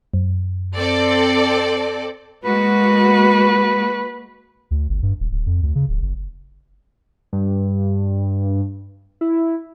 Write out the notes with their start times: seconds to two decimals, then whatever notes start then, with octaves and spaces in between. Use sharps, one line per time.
0.14 F#2
0.76 C4 A4 D5
2.44 G#3 A#3 F#4 B4
4.71 D2
4.89 G1
5.03 G2
5.20 D#1
5.31 D1
5.46 F2
5.63 D2
5.75 C#3
5.89 D1
6.02 F#1
7.33 G2
9.21 E4